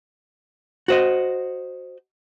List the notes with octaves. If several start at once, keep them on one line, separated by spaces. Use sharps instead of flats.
F#4 C5 D#5